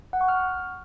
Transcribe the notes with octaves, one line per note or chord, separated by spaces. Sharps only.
F#5
C#6
F6